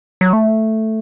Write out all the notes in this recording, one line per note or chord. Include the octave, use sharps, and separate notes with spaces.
F#3
A3